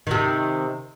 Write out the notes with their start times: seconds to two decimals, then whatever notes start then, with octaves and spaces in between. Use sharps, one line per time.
0.07 C3 D#3